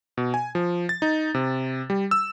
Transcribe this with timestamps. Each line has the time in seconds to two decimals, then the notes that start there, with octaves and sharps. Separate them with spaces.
0.17 B2
0.34 G#5
0.55 F3
0.89 A6
1.02 D#4
1.34 C3
1.90 G3
2.11 E6